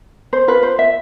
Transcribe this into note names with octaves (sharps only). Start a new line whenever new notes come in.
C5
F4 A#4 B4
C5
E5